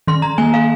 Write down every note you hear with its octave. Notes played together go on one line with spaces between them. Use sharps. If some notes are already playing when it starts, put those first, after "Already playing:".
D#3 C6
A#5
A#3 G#5
F5